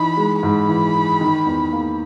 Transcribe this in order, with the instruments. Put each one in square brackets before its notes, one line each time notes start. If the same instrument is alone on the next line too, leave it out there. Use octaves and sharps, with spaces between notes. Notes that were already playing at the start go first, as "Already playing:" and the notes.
Already playing: [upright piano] E3 D#4 [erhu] B5
[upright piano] G#3
[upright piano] G#2 [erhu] B5
[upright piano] E3
D#4
D#3
E2
A#3